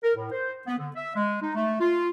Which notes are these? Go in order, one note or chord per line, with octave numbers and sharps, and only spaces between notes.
A#4
A2
C5
B3
D3
E5
G#3
D#4
A3
F4